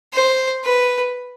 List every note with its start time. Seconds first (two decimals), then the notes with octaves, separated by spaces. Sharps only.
0.14 C5
0.64 B4